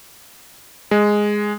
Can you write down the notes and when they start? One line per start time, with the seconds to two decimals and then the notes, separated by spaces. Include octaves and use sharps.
0.91 G#3